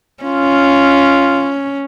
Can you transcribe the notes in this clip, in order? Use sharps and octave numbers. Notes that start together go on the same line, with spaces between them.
C#4 F4